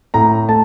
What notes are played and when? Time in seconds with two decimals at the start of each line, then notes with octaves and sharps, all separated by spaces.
0.14 A2 A#5
0.49 A3 A5